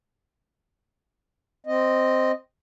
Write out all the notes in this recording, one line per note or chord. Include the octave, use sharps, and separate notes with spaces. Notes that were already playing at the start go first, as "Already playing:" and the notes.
C4 D#5